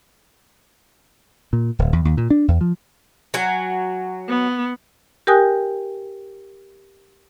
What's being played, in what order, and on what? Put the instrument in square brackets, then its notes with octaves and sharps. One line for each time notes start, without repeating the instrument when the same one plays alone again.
[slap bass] A#2
D1
E2
D#2
A#2
D4
E2
F3
[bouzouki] F#3 F#4 G#5
[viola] B3
[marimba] G4 A#4 G5 G#5 D#6 F#6